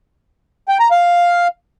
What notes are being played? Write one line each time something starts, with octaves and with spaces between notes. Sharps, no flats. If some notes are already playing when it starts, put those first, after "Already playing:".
G5
A#5
F5